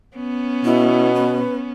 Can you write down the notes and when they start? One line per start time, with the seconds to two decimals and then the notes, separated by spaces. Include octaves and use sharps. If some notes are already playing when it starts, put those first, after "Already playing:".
0.16 B3 C#4
0.65 B2 E4
1.14 B4